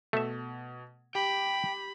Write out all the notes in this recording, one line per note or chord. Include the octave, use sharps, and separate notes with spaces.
B2 A3 E5
G4 G5 B5